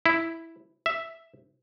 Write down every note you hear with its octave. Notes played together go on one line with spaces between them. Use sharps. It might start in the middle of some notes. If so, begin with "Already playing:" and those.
E4
E5